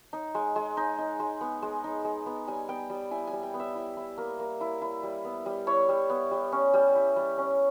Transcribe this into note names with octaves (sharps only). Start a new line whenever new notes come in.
D#4
G#3
G#3
D#4
D#4
G#3
B3
G#3
D#4
G#3
B3
G3 G#5
B3 G5
G3
E4 G#5
G#5
G3
G5
B3
E5
E4
E4
A#3
A#3
E4
E4
G3
B3
G3
E4 C#5
G3
B3
G3
C#4
G3
E4
G3
C#4